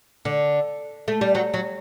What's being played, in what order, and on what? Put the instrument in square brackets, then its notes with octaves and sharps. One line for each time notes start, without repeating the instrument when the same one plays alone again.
[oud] D3
A3
G3
F#3
F#3